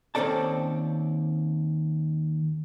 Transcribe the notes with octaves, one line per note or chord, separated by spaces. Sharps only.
D#2 C4 C#4 A4 D5 A5